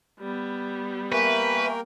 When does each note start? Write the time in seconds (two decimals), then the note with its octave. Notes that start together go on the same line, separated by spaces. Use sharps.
0.19 G3 B3
1.12 A#3 A#4 B4 E5 G5 G#5 C#6